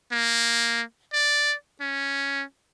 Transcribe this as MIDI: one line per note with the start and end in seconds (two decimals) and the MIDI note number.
0.12 0.82 58
1.13 1.54 74
1.81 2.43 61